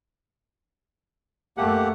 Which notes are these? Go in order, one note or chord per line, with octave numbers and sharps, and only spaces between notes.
F#2 A3 A#3 G4 F#5